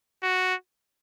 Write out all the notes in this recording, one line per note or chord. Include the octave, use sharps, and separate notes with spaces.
F#4